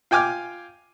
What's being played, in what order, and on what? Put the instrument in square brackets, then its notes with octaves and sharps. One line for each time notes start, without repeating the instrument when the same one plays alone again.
[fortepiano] F4 G5 G#5 D6 F6